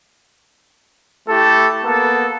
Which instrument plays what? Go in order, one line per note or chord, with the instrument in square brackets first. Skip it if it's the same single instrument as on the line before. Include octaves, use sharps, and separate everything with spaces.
[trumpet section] A3 E4 G4 A4
A#3 B3 A4